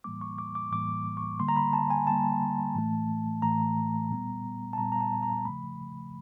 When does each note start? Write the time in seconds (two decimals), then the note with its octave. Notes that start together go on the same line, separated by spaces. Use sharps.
0.04 A2 E3 G3 A#3 D6
0.21 C#6
0.38 D6
0.55 D6
0.72 A2 E3 G3 A#3 D6
1.17 C#6
1.40 D3 G3 A#3 C6
1.49 A#5
1.56 B5
1.73 A5
1.90 G#5
2.07 D3 G3 A#3 A5
2.75 A2 E3 A3
3.42 A2 E3 A3 A#5
4.10 A#2 G3 B3
4.73 A5
4.78 A#2 G3 B3 A#5
4.92 A#5
5.01 A5
5.23 A#5
5.45 C#3 F3 A3 B5